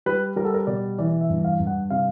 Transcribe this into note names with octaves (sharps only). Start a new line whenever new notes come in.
G3 B4
G3 A#4
A4
A#4
B2 D5
E3 D5
E5
G2
F5
G2
F#5
C3 F5